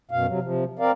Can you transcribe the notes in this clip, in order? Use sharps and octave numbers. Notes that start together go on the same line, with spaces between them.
F#2 B2 F5
C3 F#3
C3 F3
C4 A#4 D5 F5